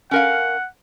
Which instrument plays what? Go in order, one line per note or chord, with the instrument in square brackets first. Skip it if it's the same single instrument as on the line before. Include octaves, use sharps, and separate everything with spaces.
[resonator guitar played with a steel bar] C#4 A#4 F5 [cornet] F#5